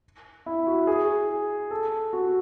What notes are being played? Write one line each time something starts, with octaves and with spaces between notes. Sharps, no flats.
E4
F#4
G#4
A4
F#4